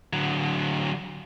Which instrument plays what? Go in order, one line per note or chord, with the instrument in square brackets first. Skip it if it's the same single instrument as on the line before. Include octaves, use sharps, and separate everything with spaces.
[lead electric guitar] D3 F#3